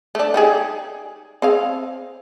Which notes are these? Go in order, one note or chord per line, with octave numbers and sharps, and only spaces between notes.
A3 D4
D#4 G4 G#4
C4 G#4 F5